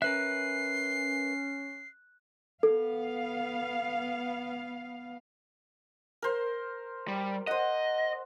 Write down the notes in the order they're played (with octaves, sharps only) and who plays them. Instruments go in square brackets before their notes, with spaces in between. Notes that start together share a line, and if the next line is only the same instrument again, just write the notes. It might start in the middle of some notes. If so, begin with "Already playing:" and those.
[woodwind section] C#4 [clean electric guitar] A#4 B4 E5 [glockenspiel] F#6 [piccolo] C7
[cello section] B3 F5 [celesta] A4
[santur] A#4 C5
[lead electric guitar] G3
[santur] C5 F#5 [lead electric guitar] D#5